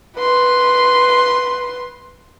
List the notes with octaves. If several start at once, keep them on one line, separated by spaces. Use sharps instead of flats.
B4 C6